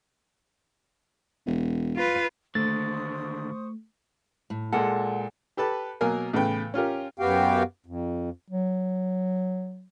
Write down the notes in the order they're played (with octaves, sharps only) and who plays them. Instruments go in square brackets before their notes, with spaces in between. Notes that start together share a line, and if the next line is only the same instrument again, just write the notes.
[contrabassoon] E1
[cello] F4 B4
[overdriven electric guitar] D#2 D3 [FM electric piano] A3 [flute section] C5 C#6 D#6 [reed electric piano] A6
[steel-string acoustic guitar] A2
[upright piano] A#2 G#3 A4 [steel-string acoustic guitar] F#5
[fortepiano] G4 A4 B4 A5
B2 F#3 A#3 A#4 G#5
A2 C#3 E3 B3 B4 G5
C#4 F4 G4 A#4
[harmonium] F#2 B3 F#4 G4 F5 G5
F2
[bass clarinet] F#3